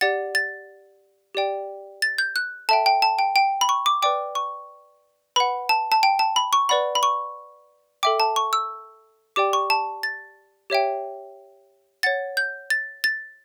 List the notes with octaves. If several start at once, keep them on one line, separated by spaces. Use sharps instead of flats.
G4 D5 F#5 A6
A6
G4 D5 G5
A6
G6
F#6
A4 E5 G5 A5
G5
A5
G5
G5
B5
C#6
D6
B4 D5 G5 D6
C#6
B4 F#5 B5
A5
A5
G5
A5
B5
C#6
B4 D5 F#5 B5
B5
C#6
A4 E5 G5 D6
A5
C#6
E6
G4 D5 G5 D6
C#6
A5
A6
G4 C#5 E5 G5
C#5 F#5 A6
G6
A6
A6